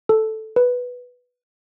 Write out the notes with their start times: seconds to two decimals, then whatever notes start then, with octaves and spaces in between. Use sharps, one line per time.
0.09 A4
0.56 B4